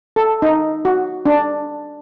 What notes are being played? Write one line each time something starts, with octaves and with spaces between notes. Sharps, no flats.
A4
D#4
F#4
D4